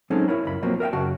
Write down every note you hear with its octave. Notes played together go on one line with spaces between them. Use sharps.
F#3 G#3 C4 C#4 D#4 A4
E4 A#4 C#5 B5
C#2 F#2 B5
B2 F3 F#3 A#3 C4
A#4 E5 F5 G5
F#2 C#3 F#4 A5